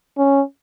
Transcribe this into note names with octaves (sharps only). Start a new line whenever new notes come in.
C#4